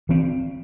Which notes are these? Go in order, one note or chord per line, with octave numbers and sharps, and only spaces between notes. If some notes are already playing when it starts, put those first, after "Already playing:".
E3 C4